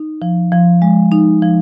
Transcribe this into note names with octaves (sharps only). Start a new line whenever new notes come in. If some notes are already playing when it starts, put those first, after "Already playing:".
Already playing: D#4
F3
F3
G#3
D#4
F3